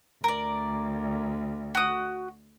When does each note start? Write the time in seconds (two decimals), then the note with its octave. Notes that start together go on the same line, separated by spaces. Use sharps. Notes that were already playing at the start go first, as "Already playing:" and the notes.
0.24 D2 A#4 D5
1.75 F#4 D#6